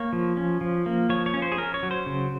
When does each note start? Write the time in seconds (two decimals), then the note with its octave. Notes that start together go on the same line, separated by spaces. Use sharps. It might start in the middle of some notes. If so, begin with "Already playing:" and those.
Already playing: A#3 C#5
0.13 F3
0.37 C#4
0.61 F3
0.86 A#3
1.10 F3 C#5
1.26 C#5
1.34 C#4
1.42 C5
1.52 G#4
1.58 C#4 A#4
1.74 C#5
1.83 F#3
1.91 C5
2.06 C#3